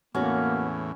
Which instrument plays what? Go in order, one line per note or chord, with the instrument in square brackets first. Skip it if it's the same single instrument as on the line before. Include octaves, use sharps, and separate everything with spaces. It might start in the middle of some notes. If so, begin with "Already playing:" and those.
[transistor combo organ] E2 A2 [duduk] A#3 [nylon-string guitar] B3 F#4 [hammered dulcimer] C#4